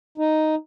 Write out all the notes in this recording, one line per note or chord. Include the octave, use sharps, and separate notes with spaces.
D#4